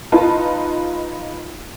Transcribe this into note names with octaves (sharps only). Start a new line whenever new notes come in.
D#4 F4 B4 A5